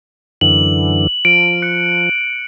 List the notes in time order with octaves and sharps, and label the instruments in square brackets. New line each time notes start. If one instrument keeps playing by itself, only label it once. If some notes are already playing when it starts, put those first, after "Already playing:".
[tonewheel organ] F#2 D3 E3 [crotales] F#7
[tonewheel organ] F3 [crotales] D7
[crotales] F#6 C#7